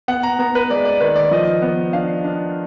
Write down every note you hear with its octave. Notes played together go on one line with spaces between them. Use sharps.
B3 F#5
A#5
B3 A#5
B4
G#3 D5
D5
D#3 B4
D5
F3 D#5
B3
D4 F5
D4